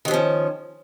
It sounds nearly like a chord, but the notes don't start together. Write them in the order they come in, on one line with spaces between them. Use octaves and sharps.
D#3 F#3 F3 C#4